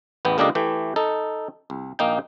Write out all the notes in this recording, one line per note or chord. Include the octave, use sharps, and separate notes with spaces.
A1 E2 B3 G5
C#2 A#3 D4 G4 A4 D#5
E3 A3 G4 G5
D#4 A4
C2
A#1 A#3 D#4 G5